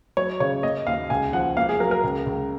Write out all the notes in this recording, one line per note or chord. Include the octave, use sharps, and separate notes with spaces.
F#3 C#5
C#3 C#5
A#3 D#5
D#2 F5
C#2 G#5
F3 F#5
A#3 F5
G#4
F#3 A#4
A#4
C#2
C#2